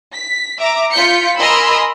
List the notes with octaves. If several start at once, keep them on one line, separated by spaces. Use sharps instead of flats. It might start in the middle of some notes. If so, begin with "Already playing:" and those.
B6
E5 A#5 D6
F4 G6 B6 C#7
A#4 D#5 G#5 B5 C6 E6